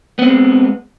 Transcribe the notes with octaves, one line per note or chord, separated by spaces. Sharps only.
G#3 B3 C4